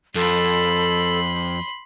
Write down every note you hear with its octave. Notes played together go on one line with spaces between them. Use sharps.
F2 A4 B5 C6